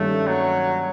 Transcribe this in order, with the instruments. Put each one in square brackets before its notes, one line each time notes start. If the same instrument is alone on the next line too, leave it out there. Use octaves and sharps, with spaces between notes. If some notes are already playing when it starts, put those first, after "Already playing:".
Already playing: [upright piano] G2 D#3 G3 A#3 C#4 [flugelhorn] A3
[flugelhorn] F#3